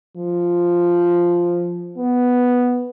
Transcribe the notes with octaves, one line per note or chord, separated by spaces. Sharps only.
F3
B3